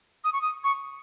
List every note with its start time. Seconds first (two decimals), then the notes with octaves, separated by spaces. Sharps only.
0.24 D#6
0.33 C#6
0.42 D#6
0.64 C#6